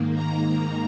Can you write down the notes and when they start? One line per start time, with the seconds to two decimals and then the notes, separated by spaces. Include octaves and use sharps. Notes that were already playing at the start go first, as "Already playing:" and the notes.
Already playing: G#2 D#3 A#3
0.15 A#5
0.44 A#5